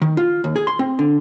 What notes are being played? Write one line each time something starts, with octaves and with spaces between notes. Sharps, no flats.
D#3
F4
D#2
G#4
C6
C4
D3